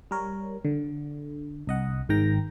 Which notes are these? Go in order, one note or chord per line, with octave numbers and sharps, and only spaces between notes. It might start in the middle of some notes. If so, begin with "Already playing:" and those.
G3 A#4 C#5
D3
C2 D#5 F#5
G#1 G#2 D#3 G5 A#5 A#6